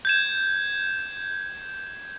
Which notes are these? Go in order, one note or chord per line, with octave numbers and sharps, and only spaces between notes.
G6 G#6 E7